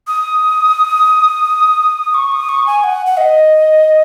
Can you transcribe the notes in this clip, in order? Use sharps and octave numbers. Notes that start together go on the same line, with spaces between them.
D#6
C#6
D#6
C#6
G#5
F#5
F#5
D#5